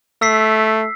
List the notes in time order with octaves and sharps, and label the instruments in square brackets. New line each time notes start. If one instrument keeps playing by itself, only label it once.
[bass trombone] A3 [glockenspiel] E6 B6 C7